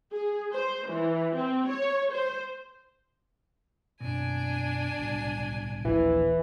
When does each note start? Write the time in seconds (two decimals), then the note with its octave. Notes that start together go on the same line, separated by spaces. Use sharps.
0.12 G#4
0.53 C5
0.88 E3
1.35 C4
1.68 C#5
2.12 C5
4.01 F#2 B2 C4 D4 G#5
4.98 D1 C2 B2
5.85 D#1 A#1 E3